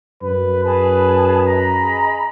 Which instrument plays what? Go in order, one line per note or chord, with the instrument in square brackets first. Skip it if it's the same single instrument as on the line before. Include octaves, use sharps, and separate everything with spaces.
[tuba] F#2 [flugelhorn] B4
[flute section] G#4 A5 [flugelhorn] B4
[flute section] D#5 A#5 B5
[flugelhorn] G#4